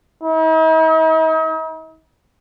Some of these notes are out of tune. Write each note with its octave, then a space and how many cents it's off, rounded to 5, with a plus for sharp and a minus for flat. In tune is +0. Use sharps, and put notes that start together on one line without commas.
D#4 +45